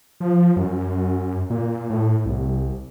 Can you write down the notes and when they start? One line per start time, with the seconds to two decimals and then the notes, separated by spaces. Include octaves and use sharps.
0.20 F3
0.57 F#2
1.50 A#2
1.90 A2
2.25 C2